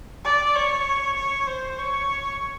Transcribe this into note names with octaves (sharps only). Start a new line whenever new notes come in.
D5
C#5
C#5
C5
C#5